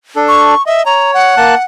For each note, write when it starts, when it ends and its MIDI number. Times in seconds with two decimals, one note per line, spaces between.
0.16 0.54 62
0.16 0.54 69
0.28 0.65 85
0.66 0.83 75
0.66 0.84 76
0.86 1.35 73
0.86 1.11 82
1.14 1.65 78
1.37 1.55 58
1.37 1.55 81
1.37 1.55 90